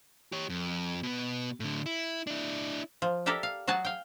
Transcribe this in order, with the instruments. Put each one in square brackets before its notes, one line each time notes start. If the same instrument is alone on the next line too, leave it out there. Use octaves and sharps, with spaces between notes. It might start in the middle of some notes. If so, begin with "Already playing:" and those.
[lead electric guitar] G4 C#5
F2
B2 B3
A2 D3
E4
D4 E4
[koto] F3
G4 A4 A#4 D5 E5 G5
F5
F#3 F#4 G#4 A5
F5 G5